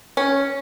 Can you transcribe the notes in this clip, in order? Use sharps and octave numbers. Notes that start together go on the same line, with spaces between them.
C#4